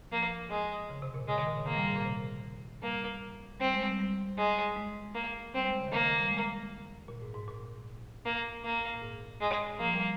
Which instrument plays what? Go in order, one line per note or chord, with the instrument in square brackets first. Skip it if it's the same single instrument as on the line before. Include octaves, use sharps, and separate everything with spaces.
[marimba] F3 [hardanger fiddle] A#3
[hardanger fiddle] G#3
[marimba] C#3
C3
A#2
[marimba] C#3 [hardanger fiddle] G#3
[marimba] D#3
A#2
C#3
[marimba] D#3 [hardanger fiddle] A#3
[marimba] G3
G#2
A#2
C3
[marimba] G3 [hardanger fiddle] A#3
[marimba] G3 [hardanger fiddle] C4
[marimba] G#3
G3
G3
[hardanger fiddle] G#3
[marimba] G#3
[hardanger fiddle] A#3
[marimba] G3 [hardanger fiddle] C4
[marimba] G#3
C#3
D#3
[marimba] C#3 [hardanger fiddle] A#3
[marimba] D#3
G3
G#3
A#2
G#2
G#2
A#2
[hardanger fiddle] A#3
A#3
[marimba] A#2
G#2
[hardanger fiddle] G#3
[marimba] F3 [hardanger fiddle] A#3
[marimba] G3